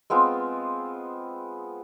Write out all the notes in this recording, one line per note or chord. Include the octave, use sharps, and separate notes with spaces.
G#3 B3 C4 F4